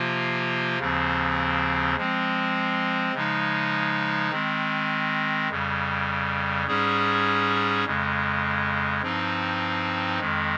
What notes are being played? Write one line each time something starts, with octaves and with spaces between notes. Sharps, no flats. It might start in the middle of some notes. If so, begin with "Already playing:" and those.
Already playing: C3 F3 A#3 F4
D#2 C#3 F3 C4
F3 G#3 C4
C#3 F3 G#3 D#4
D#3 G#3 C4
F2 C#3 G3
G#2 G3 C#4 G#4
F2 C#3 G#3
G2 F3 C4 D#4
F2 D#3 G#3